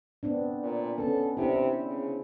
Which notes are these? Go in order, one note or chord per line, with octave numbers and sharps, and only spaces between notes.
B3 C4 D4
A#2
B3 C#4 A4
C3 C4 D4 E4
C#3